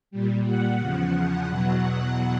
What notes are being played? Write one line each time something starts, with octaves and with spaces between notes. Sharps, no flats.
A#2 G3
F#5
E2 C#3 F3
E2 B2 F#3